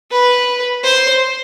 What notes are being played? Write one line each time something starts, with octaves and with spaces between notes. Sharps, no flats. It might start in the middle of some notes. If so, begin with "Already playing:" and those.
B4
C5